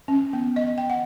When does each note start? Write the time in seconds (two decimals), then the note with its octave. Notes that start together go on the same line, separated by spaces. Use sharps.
0.08 C#4
0.33 B3
0.56 D#5
0.78 G5
0.90 F#5